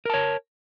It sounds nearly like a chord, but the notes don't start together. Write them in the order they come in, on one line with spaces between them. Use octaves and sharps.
A#4 A5 C#5